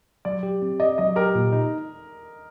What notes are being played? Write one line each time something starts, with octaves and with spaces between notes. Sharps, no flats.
F#3 D5
G4
C4
D5 D#5
F#3 D#5
G4 A#4
A#2
D#4